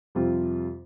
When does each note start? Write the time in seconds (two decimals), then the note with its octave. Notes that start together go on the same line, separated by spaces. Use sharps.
0.15 F2 C3 G3 C4 F4